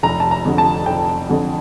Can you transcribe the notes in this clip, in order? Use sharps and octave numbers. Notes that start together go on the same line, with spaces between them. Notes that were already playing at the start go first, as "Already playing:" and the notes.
F1 A#5
A5
A#5
F2 D3
A5
F1 G5
F2 D3